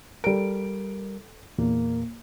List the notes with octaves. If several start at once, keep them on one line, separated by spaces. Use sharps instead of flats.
G3 A4 A#4 D7
E2 A#2 A#3